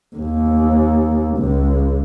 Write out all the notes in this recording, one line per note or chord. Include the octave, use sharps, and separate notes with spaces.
D#2
C#2